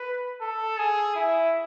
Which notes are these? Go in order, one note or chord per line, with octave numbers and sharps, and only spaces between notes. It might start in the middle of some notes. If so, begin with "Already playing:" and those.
Already playing: B4
A4
G#4
E4